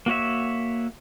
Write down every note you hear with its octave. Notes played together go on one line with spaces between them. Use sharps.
A#3 F#4 C#5 E5